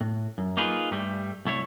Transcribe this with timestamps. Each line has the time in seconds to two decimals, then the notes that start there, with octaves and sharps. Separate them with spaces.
0.01 A2
0.38 F#2
0.57 A#3 D#4 F4 G#4 B4
0.91 G2 G3 A3
1.45 C2 A3 E4 C#5